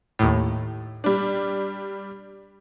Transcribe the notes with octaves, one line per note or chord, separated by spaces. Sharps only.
D#2 A2
G3 D4